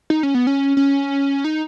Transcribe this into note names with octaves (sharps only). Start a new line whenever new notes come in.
D#4
C#4
B3
C#4
C#4
D#4